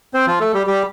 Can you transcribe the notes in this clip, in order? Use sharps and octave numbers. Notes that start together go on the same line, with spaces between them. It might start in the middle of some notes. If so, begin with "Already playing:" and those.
C4 C5
F3 F4
A3 A4
G3 G4
G3 G4